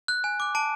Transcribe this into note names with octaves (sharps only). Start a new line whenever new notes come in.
F#6
G#5
D6 F#6
A5 D7